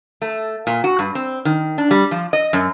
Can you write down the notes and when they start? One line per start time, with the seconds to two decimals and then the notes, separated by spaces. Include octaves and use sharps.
0.22 A3
0.67 A#2
0.84 F#4
0.99 G2
1.15 C4
1.45 D#3
1.78 D4
1.91 G3
2.11 F3
2.33 D#5
2.53 F#2